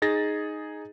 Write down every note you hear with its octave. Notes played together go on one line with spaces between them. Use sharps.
D#4 G#4 A6 A#6